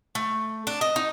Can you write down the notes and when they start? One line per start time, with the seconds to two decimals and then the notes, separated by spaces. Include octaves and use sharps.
0.15 A3
0.67 D4
0.81 D#5
0.96 D#4